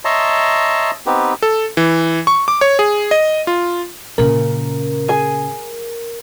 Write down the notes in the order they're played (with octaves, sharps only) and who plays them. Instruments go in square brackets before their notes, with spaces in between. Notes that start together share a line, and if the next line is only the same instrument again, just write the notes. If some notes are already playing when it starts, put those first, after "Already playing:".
[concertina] C#5 D#5 E5 A5 A#5 C6
B3 C4 D#4 G4 B4
[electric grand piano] A4
E3
C#6
D6
C#5
G#4
D#5
F4
[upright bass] A#2 C#3 [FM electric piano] A#4
[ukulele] G#4 G#5